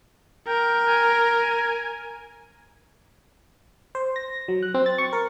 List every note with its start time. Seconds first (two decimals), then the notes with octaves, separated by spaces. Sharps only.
0.47 A#4 G5
0.86 G#5
3.95 C5
4.16 A#6
4.48 F#3
4.63 F#6
4.74 C4
4.86 A6
4.98 C#6
5.13 A#4